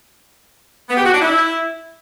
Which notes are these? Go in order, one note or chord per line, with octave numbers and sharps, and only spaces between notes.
B3
G4
F#4
D4
E4